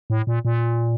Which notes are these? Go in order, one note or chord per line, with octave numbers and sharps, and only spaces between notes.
A2
A#2
A#2